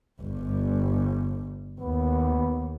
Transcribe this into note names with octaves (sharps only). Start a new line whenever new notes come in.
G1 G2
D#2 B3